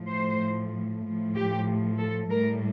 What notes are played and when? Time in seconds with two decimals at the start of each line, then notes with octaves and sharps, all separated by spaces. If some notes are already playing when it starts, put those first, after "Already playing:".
Already playing: A2 F3
0.08 C5
1.03 A2 F3
1.35 G4
1.98 A4
2.30 A2 G3 A#4